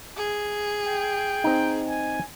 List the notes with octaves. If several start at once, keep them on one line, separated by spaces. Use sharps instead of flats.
G#4
G5
C4 D#4
G#5